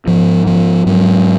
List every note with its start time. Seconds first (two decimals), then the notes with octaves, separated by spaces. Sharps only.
0.07 G#2 F3
0.47 F3
0.86 G#2 F#3